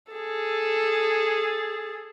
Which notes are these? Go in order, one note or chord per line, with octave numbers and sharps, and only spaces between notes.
G#4 A4